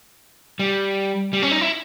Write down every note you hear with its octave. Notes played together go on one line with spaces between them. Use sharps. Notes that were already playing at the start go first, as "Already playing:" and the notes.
G3
G3
C#4
D#4
E4